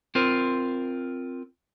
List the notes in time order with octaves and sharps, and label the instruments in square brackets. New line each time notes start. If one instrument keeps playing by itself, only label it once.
[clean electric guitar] C4 F4 A#4 C5